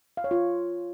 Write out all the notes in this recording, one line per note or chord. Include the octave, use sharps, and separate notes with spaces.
F5
C#5
F4